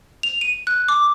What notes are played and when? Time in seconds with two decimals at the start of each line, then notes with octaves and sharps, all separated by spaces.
0.23 F7
0.41 D#7
0.67 F#6
0.88 D6